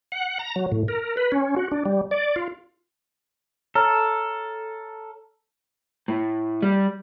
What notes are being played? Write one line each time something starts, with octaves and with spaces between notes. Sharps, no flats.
F#5
A#5
F#3
A2
A#4
B4
C#4
F#4
D4
G3
D5
F4
A4 C#5 A#5 F6
A2
G3